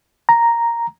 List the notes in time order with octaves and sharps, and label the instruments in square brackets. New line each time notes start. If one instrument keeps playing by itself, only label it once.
[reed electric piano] A#5